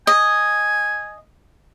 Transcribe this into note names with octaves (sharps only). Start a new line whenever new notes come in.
D#5 G#5